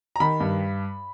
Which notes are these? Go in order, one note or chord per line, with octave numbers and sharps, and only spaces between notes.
A#5
D#3 B5
G2